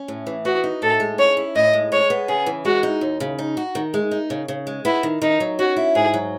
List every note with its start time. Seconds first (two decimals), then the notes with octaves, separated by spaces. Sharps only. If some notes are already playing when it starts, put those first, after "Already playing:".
Already playing: C#4
0.08 A2
0.27 E3
0.45 B3 F#4
0.64 D#4
0.82 A2 A4
1.00 G#3
1.18 C#4 C#5
1.37 E4
1.55 A2 D#5
1.73 G#3
1.92 G#3 C#5
2.10 B3
2.28 C#3 G#4
2.46 E3
2.65 G#3 F#4
2.83 D#4
3.01 D#2
3.20 C#3
3.39 D#4
3.57 F#4
3.75 D#3
3.94 G#3
4.11 D#4
4.30 C#3
4.48 C#3
4.67 G#3
4.85 B3 E4
5.03 D#3
5.22 D#3 D#4
5.40 F#3
5.58 C#4 F#4
5.76 E4
5.95 G#2 G#4
6.14 F#3